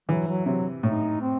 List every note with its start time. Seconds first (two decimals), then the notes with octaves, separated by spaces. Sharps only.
0.09 E3 F#3
0.28 F#3
0.46 C3 F#3
0.83 A2 D#4
1.21 C4